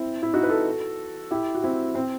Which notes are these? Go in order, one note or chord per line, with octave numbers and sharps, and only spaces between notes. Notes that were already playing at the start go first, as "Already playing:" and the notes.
Already playing: C4 E4
E4
D#4 F#4
B4
F#4 A4
E4 G4
F#4
C4 E4
C4